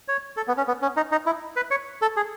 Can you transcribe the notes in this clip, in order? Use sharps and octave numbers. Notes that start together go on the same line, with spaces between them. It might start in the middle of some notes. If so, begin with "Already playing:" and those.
C#5
A4
B3
C#4
B3
C#4
D#4
D#4
E4
B4
C#5
A4
G#4